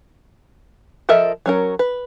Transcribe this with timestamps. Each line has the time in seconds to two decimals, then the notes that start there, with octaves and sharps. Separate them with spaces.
1.09 F3 A4 A#4 D#5 E5
1.46 F#3 C#4 A#4
1.79 B4